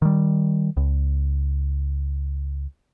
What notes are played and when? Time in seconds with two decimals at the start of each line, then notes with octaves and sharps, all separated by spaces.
0.02 D#3 G3
0.77 C#2